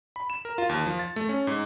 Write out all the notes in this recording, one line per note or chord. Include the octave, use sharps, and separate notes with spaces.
B5
E7
A#4
F4
D#2
F3
A6
A3
C#4
G#2